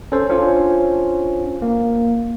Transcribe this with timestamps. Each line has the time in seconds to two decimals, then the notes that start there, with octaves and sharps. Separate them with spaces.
0.12 C#4 A4 C5
0.29 C#4 D4 F4 C5
1.62 A#3